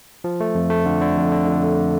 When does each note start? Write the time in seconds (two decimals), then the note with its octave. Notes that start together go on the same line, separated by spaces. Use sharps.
0.24 F3
0.40 A3
0.55 F2
0.70 A3
0.86 D3
1.01 D3
1.17 F2
1.32 D3
1.47 F2
1.63 A3